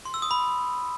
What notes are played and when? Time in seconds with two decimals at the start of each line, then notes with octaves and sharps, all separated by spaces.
0.05 C6
0.14 E6
0.22 D#6
0.31 B5